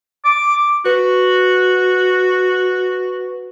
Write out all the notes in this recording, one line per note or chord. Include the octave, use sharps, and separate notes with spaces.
D6
F#4 B4